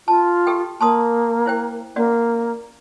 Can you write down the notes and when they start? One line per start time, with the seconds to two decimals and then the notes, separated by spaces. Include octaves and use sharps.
0.08 F4 A5
0.47 G4 A4 G5
0.81 A#3 A5 C6 D#6
1.46 E4 C5 G5
1.96 A#3 C#4 F#4 D5